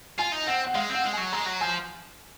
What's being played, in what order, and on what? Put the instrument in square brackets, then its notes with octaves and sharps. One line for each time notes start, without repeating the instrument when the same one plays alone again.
[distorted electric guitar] F4 [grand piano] G#5
[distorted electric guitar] D#4
[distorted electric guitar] C4 [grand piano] F#5
[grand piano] F#5
[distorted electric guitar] G#3 [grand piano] F5
[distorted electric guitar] C4
[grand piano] F#5
[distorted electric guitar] G#3
[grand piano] G#5
[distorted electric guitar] F#3
[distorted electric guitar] G#3 [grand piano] A#5
[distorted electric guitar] F#3
[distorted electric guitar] F3 [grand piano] G#5